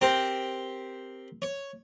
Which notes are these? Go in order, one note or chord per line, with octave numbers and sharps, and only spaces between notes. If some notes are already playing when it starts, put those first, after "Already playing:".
C4 G4 A#4 C5
C#5